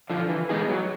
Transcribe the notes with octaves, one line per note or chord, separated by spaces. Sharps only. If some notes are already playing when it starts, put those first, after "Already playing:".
D3 F3
E3
G#3 B3 D#4 G#4
F#3